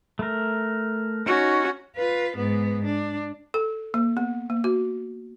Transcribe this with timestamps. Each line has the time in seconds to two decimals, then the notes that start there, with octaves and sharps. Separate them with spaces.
0.19 A3 A#4
1.26 C#4 D#4 F#4
1.96 F4 B4
2.37 G#2 B3
2.85 D4
3.54 A4
3.94 A#3
4.17 B3
4.50 A#3
4.64 F#4